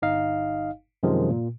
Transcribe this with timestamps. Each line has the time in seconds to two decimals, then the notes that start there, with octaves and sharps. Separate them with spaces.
0.02 G1 D#4 D#5 F5
1.03 F#2 C3 D#3 F3 G#3
1.30 A#2